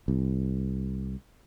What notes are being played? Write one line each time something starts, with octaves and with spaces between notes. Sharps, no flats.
C2